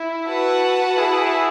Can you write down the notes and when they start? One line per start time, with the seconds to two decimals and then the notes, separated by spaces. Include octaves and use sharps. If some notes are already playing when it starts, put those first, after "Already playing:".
Already playing: E4
0.26 F#4 B4 F#5 A5
0.95 E4 G#4